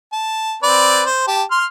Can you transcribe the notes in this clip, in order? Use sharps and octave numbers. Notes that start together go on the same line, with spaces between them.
A5
C4 B4 D5
C5
G4 A5
C6 F6